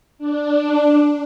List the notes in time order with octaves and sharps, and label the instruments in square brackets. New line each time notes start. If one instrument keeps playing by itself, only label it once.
[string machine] D4